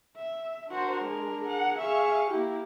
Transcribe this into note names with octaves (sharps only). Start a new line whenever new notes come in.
E5
D4 F#4 A#4 C5
G#3 G#4
G#4 F#5
G#4 E5 F5 C#6
A#3 E4 G4